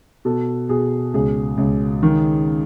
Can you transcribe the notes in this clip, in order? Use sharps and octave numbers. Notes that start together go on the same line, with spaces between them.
B2 A4
B2 G#4
C#2 G#4
C#2
D#3